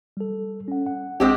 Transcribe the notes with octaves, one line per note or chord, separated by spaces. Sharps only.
G3 A4
C#4 F#5
F#5
A#1 G#3 C4 D4 G4